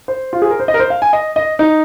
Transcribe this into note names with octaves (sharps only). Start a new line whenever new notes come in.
C5
F4
G#4
A#4
C5
D#5
A#4
C5
F5
G#5
D#5
D#5
D#4